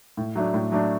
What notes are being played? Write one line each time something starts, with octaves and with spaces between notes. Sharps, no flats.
A2
F#3 A3 D4
A2
F#3 A3 D4